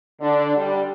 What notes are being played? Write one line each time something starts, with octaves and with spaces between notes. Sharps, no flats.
D3 D4
G3